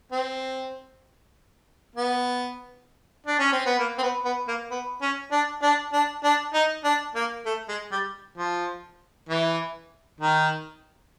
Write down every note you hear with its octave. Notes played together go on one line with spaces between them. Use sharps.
C4
B3
D4
C#4
C4
B3
A#3
C4
B3
B3
A#3
B3
C#4
D4
D4
D4
D4
D#4
D4
A#3
A3
G#3
G3
F3
E3
D#3